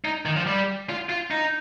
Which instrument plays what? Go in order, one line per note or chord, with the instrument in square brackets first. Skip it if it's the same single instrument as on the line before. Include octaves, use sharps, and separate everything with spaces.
[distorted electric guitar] D#4
D#3
F3
G3
F4
F4
D#4